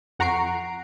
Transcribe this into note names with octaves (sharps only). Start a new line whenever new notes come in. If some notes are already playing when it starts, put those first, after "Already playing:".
F2 F#5 A#5 C#6 C7 D7